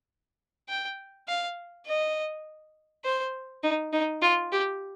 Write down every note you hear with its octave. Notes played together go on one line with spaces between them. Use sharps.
G5
F5
D#5
C5
D#4
D#4
F4
G4